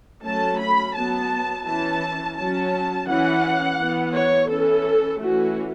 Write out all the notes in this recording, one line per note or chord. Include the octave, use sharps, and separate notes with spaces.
F#3 A3 C#4 A5
B5
F#3 B3 A5
E3 C#4 A5
F#3 C#4 A5
E3 C#4 F#5
E3 B3
C#5
E3 C#4 A4
E3 A3 C#4 F#4